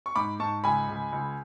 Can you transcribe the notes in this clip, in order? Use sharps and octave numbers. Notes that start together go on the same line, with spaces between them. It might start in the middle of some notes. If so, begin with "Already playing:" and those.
C#6
G#2 B5 D6
G#2 A5 C#6
C#2 G#5 B5
C#2
C#2